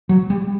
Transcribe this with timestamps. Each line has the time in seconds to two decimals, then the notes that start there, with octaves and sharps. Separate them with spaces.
0.09 F#3
0.30 G3